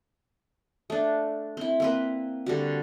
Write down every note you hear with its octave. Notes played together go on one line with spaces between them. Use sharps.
A3 D4
C4 E4
A#3 C4 B4
D3 G3 F#4